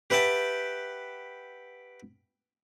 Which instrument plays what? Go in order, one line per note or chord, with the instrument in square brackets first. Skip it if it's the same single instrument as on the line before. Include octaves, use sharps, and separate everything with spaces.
[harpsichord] G4 B4 E5 F#5 G5 A5